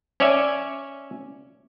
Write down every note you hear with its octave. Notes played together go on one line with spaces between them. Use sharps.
C#4 C#5 D5 E5 G#5